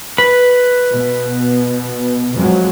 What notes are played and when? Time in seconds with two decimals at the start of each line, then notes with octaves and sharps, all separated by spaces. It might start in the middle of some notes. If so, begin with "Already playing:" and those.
0.18 B4 B5
0.91 B2
2.35 F2 F#3 G#3